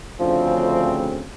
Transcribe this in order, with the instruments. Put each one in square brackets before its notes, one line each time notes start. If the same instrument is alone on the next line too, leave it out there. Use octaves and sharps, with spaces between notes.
[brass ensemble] D2 C#3 C4 [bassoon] F3